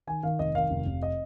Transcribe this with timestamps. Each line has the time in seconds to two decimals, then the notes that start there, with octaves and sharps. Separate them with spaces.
0.07 D#3 G#5
0.23 D#3 F5
0.39 F1 D#5
0.55 D#3 F5
0.70 F1
0.86 F1
1.03 D#5